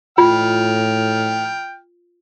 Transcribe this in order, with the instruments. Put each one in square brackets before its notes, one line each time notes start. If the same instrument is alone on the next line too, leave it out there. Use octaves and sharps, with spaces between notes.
[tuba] A2 [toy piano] F4 [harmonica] G5 F6